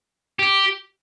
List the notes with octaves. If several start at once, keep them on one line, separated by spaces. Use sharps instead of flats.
G4